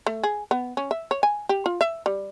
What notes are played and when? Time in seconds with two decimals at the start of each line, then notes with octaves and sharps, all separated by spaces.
0.06 A3
0.23 G#4
0.51 B3
0.77 C#4
0.91 E5
1.11 C#5
1.23 G#5
1.49 G4
1.66 F4
1.81 E5
2.06 G3